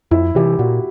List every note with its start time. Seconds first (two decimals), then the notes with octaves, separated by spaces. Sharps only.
0.11 F2 E4
0.35 C3 E3 G4
0.59 A#2 F#4